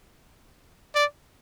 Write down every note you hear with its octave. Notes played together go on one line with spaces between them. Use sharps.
D5